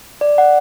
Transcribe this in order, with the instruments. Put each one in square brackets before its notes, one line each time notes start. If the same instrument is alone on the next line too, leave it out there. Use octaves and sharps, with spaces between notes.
[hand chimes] D5
F#5